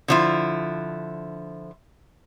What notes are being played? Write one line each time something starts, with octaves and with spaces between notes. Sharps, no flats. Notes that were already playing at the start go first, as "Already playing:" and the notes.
D3 F3 E4